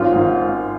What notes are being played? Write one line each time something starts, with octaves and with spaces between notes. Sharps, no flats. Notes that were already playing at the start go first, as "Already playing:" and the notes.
Already playing: G#1 C#4 F4
G#2 D#3